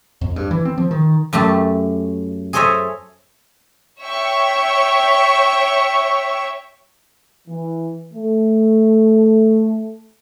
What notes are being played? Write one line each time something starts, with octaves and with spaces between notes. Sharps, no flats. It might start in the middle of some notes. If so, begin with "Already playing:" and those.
F2
G2
E3
C4
F3
D#3
F#2 A3 G4 A5
G#4 A4 C5 C#5 D#5 E5
C#5 E5 G5 C#6
E3
A3